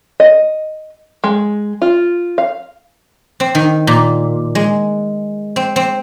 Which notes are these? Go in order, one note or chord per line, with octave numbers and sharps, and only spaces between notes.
D#5
G#3
F4
F5
C4
D#3
A#2
G#3
C4
C4